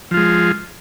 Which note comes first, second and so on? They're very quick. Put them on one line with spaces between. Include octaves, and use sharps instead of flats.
F3 F4 G#3